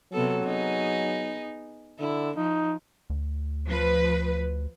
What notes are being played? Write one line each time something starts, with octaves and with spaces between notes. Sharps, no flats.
C3 F#3 B3 A4
B3 D#4 G#4
D3 E4
F3 D#4
D2
F3 B4